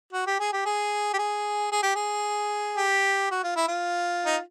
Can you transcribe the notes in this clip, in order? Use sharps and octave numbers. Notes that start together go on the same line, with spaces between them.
F#4
G4
G#4
G4
G#4
G4
G#4
G#4
G4
G#4
G4
F#4
F4
E4
F4
D#4